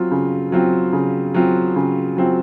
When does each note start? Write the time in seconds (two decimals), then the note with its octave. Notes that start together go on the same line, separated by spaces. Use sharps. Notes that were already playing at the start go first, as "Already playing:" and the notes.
Already playing: F#3 C4 F4
0.11 C#3
0.52 F#3 C4 F4
0.93 C#3
1.34 F#3 C4 F4
1.76 C#3
2.17 F#3 C4 F4